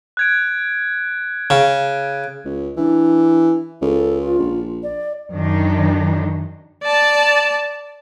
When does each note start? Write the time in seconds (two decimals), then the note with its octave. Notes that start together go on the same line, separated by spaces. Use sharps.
0.17 F#6 G#6 D7
1.50 C#3
2.45 C#2
2.77 E3 D4
3.82 C#2 A4
4.21 F4
4.39 A#1
4.83 D5
5.34 F#2 D#3 D4 D#4
6.83 D5 A5